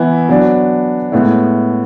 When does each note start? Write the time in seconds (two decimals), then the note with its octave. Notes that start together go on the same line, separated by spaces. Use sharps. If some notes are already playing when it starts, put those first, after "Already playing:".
Already playing: E3 B3 E4
0.29 F#3 B3 D4
1.12 A2 G#3 B3 E4